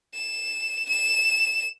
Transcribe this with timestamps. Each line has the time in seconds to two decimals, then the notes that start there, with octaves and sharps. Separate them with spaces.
0.14 E7
0.89 E7